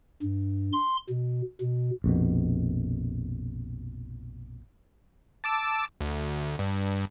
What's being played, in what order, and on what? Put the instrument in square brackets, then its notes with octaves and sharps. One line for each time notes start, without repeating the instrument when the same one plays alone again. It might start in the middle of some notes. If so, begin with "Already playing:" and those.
[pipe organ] G2
C6
B2
B2
[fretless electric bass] A#1 F2 B2
[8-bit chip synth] A5 D6 E6
D2
G2